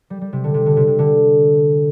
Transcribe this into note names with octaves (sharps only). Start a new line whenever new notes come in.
G3
G3
C3
D3
C3
D3
C3
C3
D3